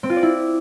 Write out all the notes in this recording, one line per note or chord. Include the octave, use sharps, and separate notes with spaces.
C4
F4
D5
E4